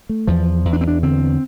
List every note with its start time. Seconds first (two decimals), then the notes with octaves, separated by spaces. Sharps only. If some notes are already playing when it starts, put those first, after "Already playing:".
0.09 A3
0.27 E2 F3
0.65 E2
0.73 D4
0.81 C4
0.88 D4
1.03 D3 C4